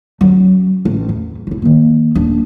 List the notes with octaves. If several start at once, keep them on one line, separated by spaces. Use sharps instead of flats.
F#3 C#4
A1
E2
E1 E4
D#3 A#3
D#1 D4